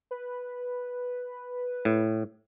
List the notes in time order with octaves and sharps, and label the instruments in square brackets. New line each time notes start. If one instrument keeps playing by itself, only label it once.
[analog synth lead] B4
[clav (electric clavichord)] A2